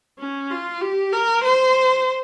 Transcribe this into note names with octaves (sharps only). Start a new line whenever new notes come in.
C#4
F4
G4
A#4
C5